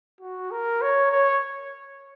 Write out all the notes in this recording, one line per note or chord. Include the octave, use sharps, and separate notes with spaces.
F#4
A#4
C#5
C#5